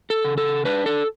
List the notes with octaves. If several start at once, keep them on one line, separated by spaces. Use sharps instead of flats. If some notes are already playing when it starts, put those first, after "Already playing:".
A4
C#3
A4
D4 B4
A4